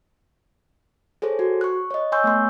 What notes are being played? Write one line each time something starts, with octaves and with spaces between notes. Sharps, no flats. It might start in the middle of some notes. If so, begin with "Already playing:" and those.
G#4 A4 C5 C#5
F#4
C#6 F#6
C#5 D#5
C#5 G#5 C6 C#6 E6 G6
A3 B3 C6